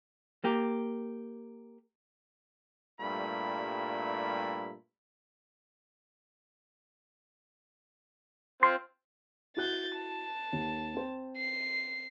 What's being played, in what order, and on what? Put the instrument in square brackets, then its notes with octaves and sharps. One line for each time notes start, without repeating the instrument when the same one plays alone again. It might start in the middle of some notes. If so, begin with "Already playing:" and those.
[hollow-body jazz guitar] A#3 G4
[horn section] G2 A#2 G3 A3 E4 B5
[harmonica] C4 F4 [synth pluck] C6
[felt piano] E4 F#4 F#6 [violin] G6 A6
[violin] A5
[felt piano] D#2
C4 C5
[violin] C7